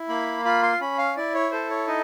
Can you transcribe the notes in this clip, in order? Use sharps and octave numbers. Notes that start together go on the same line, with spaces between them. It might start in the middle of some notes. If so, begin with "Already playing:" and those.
Already playing: E4
A#3 B5
F4 B5
C6
C#4 B5
F5
E4 D5
C#5
A4 C5
C#5
D#4 D#5